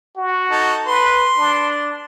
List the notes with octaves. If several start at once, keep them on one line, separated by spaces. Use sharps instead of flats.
F#4
D#4 A4
B4 C6
D4